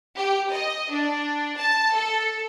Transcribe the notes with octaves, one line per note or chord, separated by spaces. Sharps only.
G4
D#5
D4
A5
A4